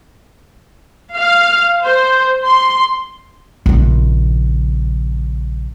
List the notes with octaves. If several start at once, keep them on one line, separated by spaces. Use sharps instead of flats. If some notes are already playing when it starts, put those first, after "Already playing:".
F5
C5
C6
A#1 C#3